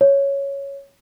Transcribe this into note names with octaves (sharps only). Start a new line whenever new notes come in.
C#5